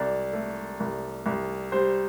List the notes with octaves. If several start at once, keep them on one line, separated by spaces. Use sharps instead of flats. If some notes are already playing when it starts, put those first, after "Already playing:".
Already playing: C2 D5
A3
C2
C2
G3 C5